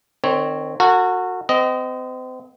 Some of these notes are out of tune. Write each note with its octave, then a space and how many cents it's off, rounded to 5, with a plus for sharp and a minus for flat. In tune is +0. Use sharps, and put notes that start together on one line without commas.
D#3 -35 C4 +0 C#5 +0
F#4 -15 A#4 -45 G#5 +0
C4 -35 D#5 +0